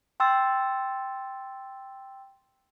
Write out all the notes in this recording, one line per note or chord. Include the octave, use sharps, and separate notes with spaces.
G5 C6 E6 A6